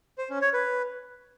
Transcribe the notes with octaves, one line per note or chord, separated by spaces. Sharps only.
C5
C#4
C#5
B4